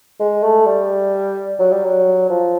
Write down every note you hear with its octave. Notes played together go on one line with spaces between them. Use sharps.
G#3
A3
G3
F#3
G3
F#3
F3